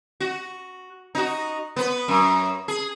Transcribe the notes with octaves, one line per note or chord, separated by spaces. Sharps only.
F#4
D#4 F#4
B3 B4
F#2
G#4